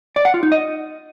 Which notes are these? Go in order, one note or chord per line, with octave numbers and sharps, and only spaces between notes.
D5
F#5
F4
D#4
D#5